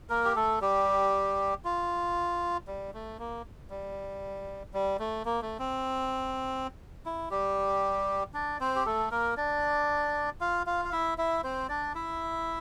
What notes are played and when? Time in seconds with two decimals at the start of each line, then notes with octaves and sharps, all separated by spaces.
0.09 A#3 A#4
0.25 G4
0.36 A3 A4
0.61 G3 G4
1.65 F4
2.67 G3
2.94 A3
3.19 A#3
3.70 G3
4.74 G3
4.99 A3
5.25 A#3
5.42 A3
5.59 C4
7.06 E4
7.31 G3 G4
8.34 D4 D5
8.60 C4 C5
8.76 G4
8.86 A3 A4
9.11 A#3 A#4
9.37 D4 D5
10.41 F4 F5
10.67 F4 F5
10.85 F5
10.92 E4 E5
11.18 E4 E5
11.44 C4 C5
11.69 D4 D5
11.95 E4 E5